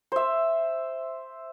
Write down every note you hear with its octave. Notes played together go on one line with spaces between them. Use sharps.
C5 E5